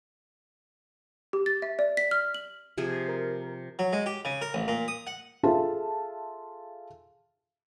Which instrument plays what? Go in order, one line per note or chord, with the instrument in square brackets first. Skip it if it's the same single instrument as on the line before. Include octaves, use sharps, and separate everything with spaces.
[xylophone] G4
A6
E5
D5
B6
F6
F#7
[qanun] C3 F3 G#4
[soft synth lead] A#4
[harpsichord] F#3
G#3
G4
C#3
A#4
A1
A#2
D#6
F#5
[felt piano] F4 G#4 A4 E5 A5